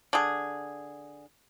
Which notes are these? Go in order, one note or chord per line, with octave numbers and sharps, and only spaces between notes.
D3 G#4